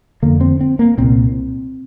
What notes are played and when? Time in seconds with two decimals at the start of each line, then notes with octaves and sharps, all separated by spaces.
0.22 F2 D3 A#3
0.41 C4
0.61 C4
0.79 A#3
0.98 C2 A#2 C4